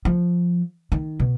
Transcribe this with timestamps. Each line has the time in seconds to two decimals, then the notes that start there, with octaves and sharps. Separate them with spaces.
0.05 F3
0.92 D#3
1.20 B2